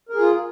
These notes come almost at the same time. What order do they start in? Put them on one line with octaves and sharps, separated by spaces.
A#4 G#4 F4